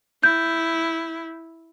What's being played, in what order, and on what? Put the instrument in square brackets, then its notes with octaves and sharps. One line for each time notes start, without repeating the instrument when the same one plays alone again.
[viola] E4 [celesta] G6